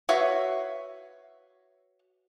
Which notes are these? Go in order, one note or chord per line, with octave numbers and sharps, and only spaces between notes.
F#4 B4 C#5 E5 F5